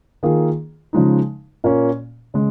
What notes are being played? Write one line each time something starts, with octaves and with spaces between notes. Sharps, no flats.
D#3 A#3 F4 G#4
C#3 F3 G#3 D#4
A#2 A#3 C#4
C#3 G#3